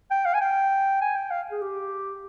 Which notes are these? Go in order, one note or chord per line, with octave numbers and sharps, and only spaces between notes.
G5
F5
G#5
G5
G#5
G5
F5
G#4
G4